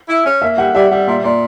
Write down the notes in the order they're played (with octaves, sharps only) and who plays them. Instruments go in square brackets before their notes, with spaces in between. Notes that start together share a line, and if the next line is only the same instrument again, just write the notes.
[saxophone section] E4
C#4
[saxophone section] A#3 [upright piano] E5
[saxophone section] G3 [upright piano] F#5
[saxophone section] G3 [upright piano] E5
[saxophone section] G3 [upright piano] F#5
[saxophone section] A#2 [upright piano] E5
[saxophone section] A#2 [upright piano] D5